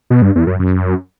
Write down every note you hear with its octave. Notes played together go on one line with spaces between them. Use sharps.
B2
G2
E2
F#2
F#2